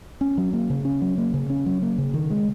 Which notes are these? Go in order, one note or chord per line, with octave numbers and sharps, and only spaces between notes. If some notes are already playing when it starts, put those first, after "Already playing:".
C#4
F#3
A#3
C#3
C#4
F#3
A#3
C#3
C#4
F#3
A#3
C#3
D#3
G#3